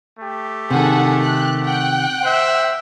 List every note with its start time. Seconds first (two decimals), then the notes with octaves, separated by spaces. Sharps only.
0.19 A3 G4
0.71 C3 D#3 G#4 A4 F#5
1.21 F#6
1.62 F#5 G5 F#6
2.24 C5 E5